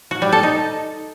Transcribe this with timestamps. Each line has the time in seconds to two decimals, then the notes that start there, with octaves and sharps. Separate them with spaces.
0.11 F#4
0.22 G3
0.32 A4
0.43 D#4